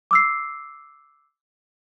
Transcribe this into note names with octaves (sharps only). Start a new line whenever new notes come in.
D6 E6 C7